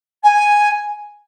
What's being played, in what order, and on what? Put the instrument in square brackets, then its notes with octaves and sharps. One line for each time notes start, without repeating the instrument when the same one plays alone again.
[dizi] G#5